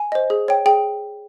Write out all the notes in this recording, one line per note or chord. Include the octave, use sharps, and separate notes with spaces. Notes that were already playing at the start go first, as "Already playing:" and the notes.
Already playing: G#5
C5 D#5
G#4
C#5 G5
G#4 G5